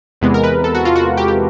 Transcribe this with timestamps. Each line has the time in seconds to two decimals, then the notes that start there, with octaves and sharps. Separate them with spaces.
0.21 E2 C3 E3 G#3 B3
0.34 A#4
0.44 B4
0.64 A4
0.75 F#4
0.85 F4
0.96 F#4
1.17 G4
1.28 G4